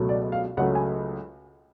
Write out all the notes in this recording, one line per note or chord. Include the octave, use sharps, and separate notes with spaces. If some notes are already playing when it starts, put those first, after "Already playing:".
Already playing: C#2 B2 F#3 A3
D5
F5
C#2 C#3 F#3 A3 F#5
G#5